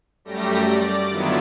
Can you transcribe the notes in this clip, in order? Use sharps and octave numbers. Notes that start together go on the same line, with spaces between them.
F#2 G3 A3 G4 A#6
D5 D6
D3 D#3 F#3 B3 E4 F4